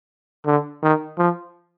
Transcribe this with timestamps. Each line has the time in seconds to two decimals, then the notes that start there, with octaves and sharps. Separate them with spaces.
0.46 D3
0.82 D#3
1.18 F3